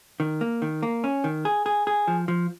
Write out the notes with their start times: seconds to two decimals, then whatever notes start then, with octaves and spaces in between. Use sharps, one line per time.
0.20 D#3
0.41 A#3
0.62 D#3
0.83 A#3
1.04 C#4
1.24 D#3
1.45 G#4
1.66 G#4
1.87 G#4
2.08 F3
2.28 F3